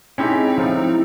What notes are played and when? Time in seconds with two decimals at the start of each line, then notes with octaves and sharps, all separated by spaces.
0.18 G#3 C4 C#4 D#4 E4 G4 E5
0.58 A2 F3 A4